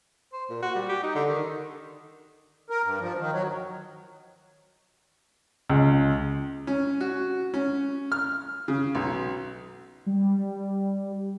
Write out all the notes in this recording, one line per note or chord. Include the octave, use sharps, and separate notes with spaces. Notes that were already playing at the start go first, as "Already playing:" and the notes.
C5
A#2
F#4
G3
G4
D#4
D3
D#3
A#4
G2
F3
D#3
F#3
C#2
C#4
F#4
C#4
F6
C#3
B1
G3